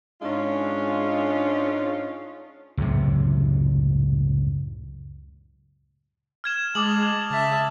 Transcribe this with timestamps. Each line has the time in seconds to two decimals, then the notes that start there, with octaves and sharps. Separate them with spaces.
0.22 G#2 G#3 C#4 D4 F4
2.77 C#2 F#2 A2 C3
6.44 F6 G#6 E7
6.75 G#3 A5 D6 D#6 F#7
7.30 C#3 E5 A5